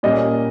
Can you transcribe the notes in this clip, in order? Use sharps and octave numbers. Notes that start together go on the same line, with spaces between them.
A#2 G3 A#3 C#4 D#5